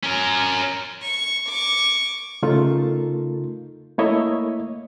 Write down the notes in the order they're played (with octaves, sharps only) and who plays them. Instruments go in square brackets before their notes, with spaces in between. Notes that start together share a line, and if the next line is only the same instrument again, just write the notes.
[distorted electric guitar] C#4 A#4
[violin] C#6
C#6 D6
[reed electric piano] C#3 A3 D#4 F4 A4 A#4
A3 A#3 E4 C#5 D#5 E5